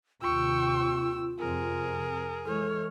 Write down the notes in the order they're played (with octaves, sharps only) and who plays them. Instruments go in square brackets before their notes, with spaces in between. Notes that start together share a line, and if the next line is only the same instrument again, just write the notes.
[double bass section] D#2 C3 [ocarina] F4 [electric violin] G5 C#6 [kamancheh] E6
[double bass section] F2 C3 C4 [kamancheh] G#4 [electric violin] A#4
[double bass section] E3 G#3 [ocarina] A4 [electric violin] C#5 F6